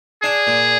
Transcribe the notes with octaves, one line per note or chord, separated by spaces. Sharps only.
D4 G#4
A#2